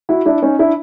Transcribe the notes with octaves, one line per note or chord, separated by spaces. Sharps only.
E4 F#4
D4 E4
C#4 D#4
D4 E4